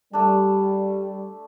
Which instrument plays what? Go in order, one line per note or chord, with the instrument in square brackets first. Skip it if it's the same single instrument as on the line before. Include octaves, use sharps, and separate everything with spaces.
[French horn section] G3 [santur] A3 D4